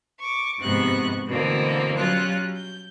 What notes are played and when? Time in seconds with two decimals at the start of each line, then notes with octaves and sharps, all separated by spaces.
0.20 C#6 D6
0.58 F2 G#2 C3 B3 C#6 F#6
1.27 B2 D3 E3 A3 A#3 C4
1.97 F#3 G3 C#4 F4 F#6
2.56 G6